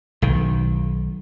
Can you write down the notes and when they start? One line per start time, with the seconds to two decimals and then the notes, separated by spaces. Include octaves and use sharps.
0.22 B1 D#3